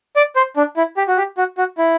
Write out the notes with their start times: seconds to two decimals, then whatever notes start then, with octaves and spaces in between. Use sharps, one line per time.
0.16 D5
0.36 C5
0.57 D4
0.77 E4
0.97 G4
1.08 F#4
1.17 G4
1.38 F#4
1.58 F#4
1.78 E4